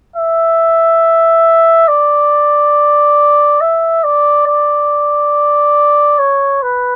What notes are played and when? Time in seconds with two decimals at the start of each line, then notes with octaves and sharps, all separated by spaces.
0.16 E5
1.88 D5
3.61 E5
4.04 D5
4.47 D5
6.19 C#5
6.63 B4